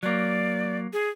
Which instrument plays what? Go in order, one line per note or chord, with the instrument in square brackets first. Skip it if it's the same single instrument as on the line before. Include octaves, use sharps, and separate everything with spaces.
[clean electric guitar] F#3 A#3 [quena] D5
[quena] G#4